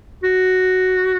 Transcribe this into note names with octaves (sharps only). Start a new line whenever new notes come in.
F#4